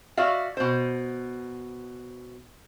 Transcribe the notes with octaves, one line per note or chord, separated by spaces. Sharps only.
F#4 D5 E5 F5
B2 C5